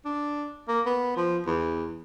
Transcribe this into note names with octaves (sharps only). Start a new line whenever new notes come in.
D4
A#3
B3
F3
E2